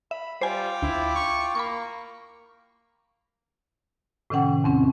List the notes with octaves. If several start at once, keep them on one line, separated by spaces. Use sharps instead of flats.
E5 B5
G3 F4 C5 G5 G#5 D6
D2 E4
C#6
A#3 B5 C#6
A2 C3 D#3 C#4 F#5 G5
E2 C4 C#4